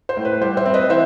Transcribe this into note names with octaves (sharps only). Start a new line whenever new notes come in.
C5
A2
B4
G3 C5
C5 E5
C4
B4 D#5
E3 C5 E5